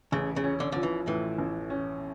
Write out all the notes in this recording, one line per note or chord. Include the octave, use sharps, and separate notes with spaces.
A1 C#3
C#3
C#4
D3
D3 F3
E3
A2 E3
A1
C#4